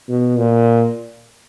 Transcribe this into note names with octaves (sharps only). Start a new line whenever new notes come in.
B2
A#2